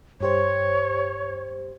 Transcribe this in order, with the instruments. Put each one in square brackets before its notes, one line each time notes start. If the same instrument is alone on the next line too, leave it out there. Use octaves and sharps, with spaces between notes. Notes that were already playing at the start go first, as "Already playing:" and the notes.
[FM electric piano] G2 G4 C5 [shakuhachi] C#5